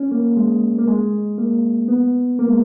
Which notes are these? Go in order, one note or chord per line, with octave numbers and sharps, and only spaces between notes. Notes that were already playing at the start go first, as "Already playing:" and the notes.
Already playing: C#4
A#3
G#3
A#3
G#3
A#3
B3
A#3
G#3